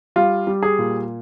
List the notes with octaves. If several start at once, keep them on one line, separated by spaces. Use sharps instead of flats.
G3 F4
G3
G#4
A#2